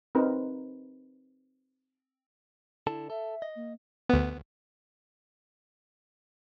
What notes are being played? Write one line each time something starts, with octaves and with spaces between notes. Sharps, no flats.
C4 D#4 A#4 B4
D3 E4 A4 A5
A4 E5
D#5
A#3
D2 B3